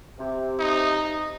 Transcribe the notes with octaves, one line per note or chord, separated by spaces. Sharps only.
C3
D#4